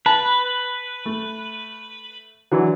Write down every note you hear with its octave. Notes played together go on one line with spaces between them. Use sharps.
B4 A5
A3
D3 E3 F#3